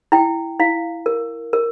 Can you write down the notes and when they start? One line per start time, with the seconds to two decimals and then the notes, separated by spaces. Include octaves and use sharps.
0.12 E4 G5
0.60 E4 F5
1.06 A#4
1.53 A#4